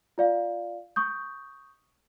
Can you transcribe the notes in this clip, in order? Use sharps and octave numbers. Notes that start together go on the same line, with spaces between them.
F4 D5 F5
C#6 D#6 G6